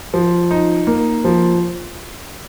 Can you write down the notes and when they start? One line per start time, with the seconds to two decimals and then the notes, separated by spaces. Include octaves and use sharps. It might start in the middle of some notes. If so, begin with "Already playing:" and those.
0.14 F3
0.51 D#4
0.87 A#3
1.25 F3